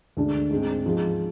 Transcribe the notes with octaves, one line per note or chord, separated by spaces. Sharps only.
D2 D3 G#3 D4
G#2 G#3 C4
G#2 F3 G#3